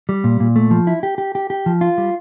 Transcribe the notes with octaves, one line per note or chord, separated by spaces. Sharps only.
G3
A#2
A#2
A3
F3
E4
G4
G4
G4
G4
F3
F4
G3